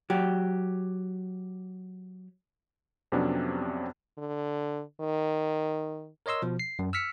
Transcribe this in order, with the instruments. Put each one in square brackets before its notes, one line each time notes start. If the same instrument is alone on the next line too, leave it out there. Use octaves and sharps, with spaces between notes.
[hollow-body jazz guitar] F#3 G4
[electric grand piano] F2 C3 F#3 B3 C#4 D4
[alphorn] D3
D#3
[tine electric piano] A#4 C#5 D#5 C6 E6
B2 F3
C7
F#2
E6 F6 B6 C#7